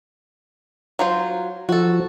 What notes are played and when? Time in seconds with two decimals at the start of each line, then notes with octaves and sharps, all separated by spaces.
0.99 F#3 F4 C5
1.69 F3 F#4 A4